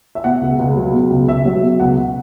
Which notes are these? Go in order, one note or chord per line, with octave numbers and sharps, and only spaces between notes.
E5
B2 F#5
C#2
C#2
F#3
B2
C#2
C#2 E5
F#3
B2
C#2 F#5